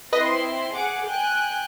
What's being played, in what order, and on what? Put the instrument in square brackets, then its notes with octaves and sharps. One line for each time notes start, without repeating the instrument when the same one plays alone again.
[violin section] C4 E4 C6 [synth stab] B4 D#5
[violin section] G#4 F#5 D6
G5 G#5 F#6